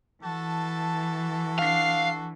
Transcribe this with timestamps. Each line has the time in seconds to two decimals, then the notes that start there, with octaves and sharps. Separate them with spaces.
0.24 E3 F#4 A4 A5
1.59 D4 F5 C7